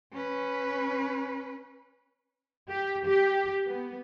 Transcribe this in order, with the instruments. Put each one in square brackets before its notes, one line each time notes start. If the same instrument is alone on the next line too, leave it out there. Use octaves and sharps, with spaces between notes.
[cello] C#4 B4
[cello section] G4
G4
B3